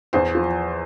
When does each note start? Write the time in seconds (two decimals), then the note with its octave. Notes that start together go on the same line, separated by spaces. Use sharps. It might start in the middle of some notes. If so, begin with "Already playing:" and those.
0.13 E2 C5
0.35 F3